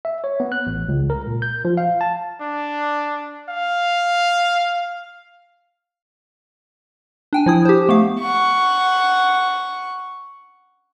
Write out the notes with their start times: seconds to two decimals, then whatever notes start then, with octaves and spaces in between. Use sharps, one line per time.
0.05 E5
0.24 C#5
0.40 B3
0.52 F#6
0.67 A1
0.88 C#2
1.10 A#4
1.27 A#2
1.42 G6
1.65 F3
1.77 F5
2.01 A5
2.41 D4
3.49 F5
7.33 D4 G5 G#5
7.46 F3 E4 D#6
7.65 G4 C5
7.89 A3 B3 F5
8.20 F#5 C#6